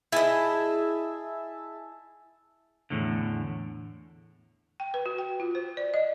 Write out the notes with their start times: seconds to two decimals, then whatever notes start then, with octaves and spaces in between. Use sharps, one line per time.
0.12 E4 G#4 D#5 E5 A5
2.90 E2 A2 D3
4.80 G5
4.94 B4
5.06 F#4
5.18 G5
5.40 F4
5.55 C5
5.77 D5
5.94 D#5